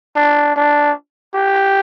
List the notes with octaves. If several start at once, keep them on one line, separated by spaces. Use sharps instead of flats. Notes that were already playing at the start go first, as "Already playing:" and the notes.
D4
D4
G4